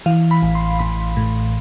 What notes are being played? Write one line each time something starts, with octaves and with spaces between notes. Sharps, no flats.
E3 F5
B5
A1
C6
A1 B5
A2